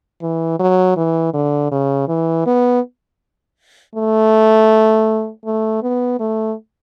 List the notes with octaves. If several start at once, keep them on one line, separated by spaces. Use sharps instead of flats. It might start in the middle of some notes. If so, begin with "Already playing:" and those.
E3
F#3
E3
D3
C#3
E3
B3
A3
A3
B3
A3